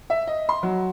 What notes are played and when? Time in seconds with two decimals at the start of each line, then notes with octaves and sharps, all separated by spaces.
0.10 E5
0.27 D#5
0.49 C6
0.63 F#3